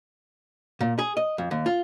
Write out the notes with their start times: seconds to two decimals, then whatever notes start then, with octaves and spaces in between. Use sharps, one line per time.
0.81 A#2
0.99 G#4
1.17 D#5
1.38 F2
1.51 D#2
1.66 F4